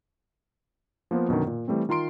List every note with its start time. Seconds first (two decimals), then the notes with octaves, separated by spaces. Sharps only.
1.11 F3 A#3 B3 F4 C5
1.29 F#2 B2 D3 D#3
1.47 A#2
1.68 E3 G3 A3 C4
1.89 D#3 F4 A#5 C6 D7